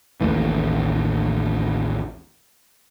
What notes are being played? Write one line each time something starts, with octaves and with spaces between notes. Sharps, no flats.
A1 D#2 A2 E3